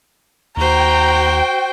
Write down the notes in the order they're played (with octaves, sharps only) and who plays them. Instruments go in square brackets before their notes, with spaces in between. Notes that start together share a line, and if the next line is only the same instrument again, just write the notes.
[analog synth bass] D#2 [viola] F#4 C5 [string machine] G5 [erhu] A#5